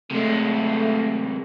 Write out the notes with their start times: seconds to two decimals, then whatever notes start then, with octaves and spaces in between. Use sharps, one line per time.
0.11 C3 G#3 A3